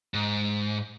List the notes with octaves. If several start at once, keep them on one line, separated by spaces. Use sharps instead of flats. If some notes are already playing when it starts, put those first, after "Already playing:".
G#2